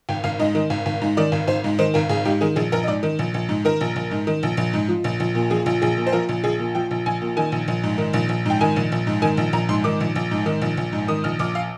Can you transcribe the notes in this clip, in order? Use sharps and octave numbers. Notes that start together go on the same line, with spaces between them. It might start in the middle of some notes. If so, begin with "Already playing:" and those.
G#1 G5
G#1 F5
G#2 D#5
D#3
G#1
G#1
G#2
D#3 D5
G#1
G#1 C5
G#2
D#3 C5
G#1 A#4
G#1 G#4
G#2 G4
D#3 G#4
A#1 G#4
A#1 A#4
D#5
G#2 D5
D#3
A#1
A#1
G#2
D#3 A#4
A#1
A#1
G#2
D#3
A#1
A#1
G#2
F3
A#1
A#1
A#2
F3 G#4
A#1
A#1 G#4
A#2
C5
F3 A#4
A#1
A#1 G#4
A#2
F3 G5
A#1
A#1 G#5
A#2
D#3 G#5
A#1
A#1
G#2
D#3
A#1
A#1
G#2 G5
D#3 G#5
A#1
A#1
G#2
D#3 G#5
A#1
A#1 A#5
G#2 C6
D#3 D6
A#1
A#1
G#2
D#3
A#1
A#1
G#2
D#3 D#6
A#1 F6
A#1 D6
F5